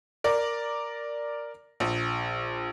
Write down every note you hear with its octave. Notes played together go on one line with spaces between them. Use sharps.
A#4 D5
A#1